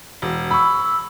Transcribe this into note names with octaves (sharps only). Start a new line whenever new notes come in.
E1
B5 C#6 E6